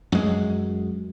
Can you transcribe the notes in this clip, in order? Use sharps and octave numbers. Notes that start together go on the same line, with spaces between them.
F#2 G#3